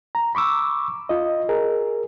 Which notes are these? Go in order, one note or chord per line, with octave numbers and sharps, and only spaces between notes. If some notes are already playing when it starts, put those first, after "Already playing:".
A#5
B5 C#6 D6 E6
F4 D#5
G#4 A#4